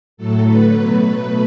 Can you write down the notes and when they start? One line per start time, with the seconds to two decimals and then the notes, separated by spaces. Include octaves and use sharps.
0.17 A2 F#3 A3 A4
0.46 D3 F#3 A3 B4
0.75 B2 F#3 A3 B4
1.03 B2 A3